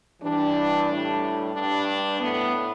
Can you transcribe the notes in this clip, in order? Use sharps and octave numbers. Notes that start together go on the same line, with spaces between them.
G2 E3 G3 D4
A2 G3
G2 G3 D4
A2 A3 B3